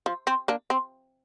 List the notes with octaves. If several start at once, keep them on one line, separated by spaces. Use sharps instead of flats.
F3
C4
A#3 D4
C4